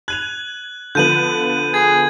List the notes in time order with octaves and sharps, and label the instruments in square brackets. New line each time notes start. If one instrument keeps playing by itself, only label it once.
[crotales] F#6 F#7 [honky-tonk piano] G#6 D#7 F7
[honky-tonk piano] D3 F3 B3 [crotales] G6 D#7 F#7
[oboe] G#4 [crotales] G#6